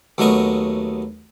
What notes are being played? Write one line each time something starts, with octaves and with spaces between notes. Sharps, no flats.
D#2 F#3 A3 B3 D#5 C#6